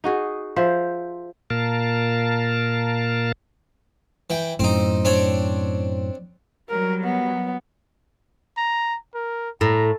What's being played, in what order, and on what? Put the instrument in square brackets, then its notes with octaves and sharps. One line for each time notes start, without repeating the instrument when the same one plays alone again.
[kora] D#4 F#4 G#4
F3 C5 E5
[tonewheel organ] A#2 A#4 F5 A5
[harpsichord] E3 G5
[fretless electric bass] F#2 A2 [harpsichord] C4 D#4
[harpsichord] C4 D4 C#5
[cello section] F#3 G3 [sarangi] A#4
[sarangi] B3
[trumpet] A#5
A#4
[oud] A2 [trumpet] A#5